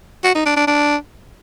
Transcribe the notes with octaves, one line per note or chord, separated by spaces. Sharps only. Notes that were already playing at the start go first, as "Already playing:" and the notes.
F#4
D#4
D4
D4
D4